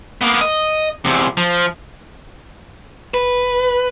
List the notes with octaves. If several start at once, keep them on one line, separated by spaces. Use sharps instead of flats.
A#3 B3
D#5
E2 C3
F3
F1 B4